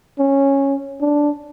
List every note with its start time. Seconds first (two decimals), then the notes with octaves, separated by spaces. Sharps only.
0.19 C#4
1.01 D4